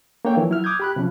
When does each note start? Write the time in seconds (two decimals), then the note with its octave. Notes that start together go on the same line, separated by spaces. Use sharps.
0.25 A#3 D4 A4 C#5 G5
0.37 E3 F3
0.49 F#3 E4 F6
0.64 D6 D#6 F6 G6 G#6
0.80 G4 B5 F#6
0.96 C3 F3 C#4